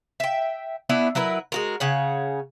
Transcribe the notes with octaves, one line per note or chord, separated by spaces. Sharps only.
E5 G5
B3 D4 E4
F#3 E4 A#4 B4
G#3 F#4 A#4
C#3 C#5 F#5